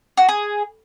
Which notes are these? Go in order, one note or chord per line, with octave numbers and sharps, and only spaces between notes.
F#4
G#4